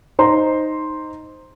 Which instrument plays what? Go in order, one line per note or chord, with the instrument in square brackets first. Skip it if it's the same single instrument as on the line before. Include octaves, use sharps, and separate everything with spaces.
[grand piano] D#4 C5 A#5 C6